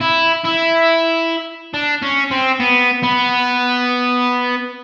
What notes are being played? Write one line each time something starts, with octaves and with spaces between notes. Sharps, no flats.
E4
E4
D4
C#4
C4
B3
B3